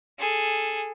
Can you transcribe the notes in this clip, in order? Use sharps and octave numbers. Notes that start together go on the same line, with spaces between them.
G#4 A4